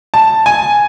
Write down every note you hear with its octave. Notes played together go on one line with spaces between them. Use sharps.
A5
G#5